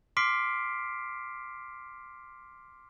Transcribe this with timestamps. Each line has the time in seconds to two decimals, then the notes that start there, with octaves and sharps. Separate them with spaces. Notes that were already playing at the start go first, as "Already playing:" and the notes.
0.17 C6 D6 F6 B6 C7 D7